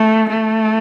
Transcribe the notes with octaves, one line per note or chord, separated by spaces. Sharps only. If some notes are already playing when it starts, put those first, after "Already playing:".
Already playing: A3
A3